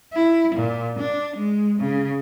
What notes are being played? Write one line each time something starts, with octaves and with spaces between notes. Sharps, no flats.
E4
A#2
D4
G#3
C#3